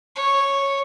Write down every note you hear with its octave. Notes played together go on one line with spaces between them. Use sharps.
C#5